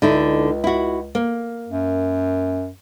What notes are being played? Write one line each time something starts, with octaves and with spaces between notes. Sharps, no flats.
C#2 D3 D#4 E4
E4 F#4
A#3
F#2